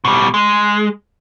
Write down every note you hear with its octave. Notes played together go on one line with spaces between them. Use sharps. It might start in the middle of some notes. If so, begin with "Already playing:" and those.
B2 G3
G#3